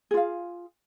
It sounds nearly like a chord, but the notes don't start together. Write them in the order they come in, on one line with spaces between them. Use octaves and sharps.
G#4 F4 F5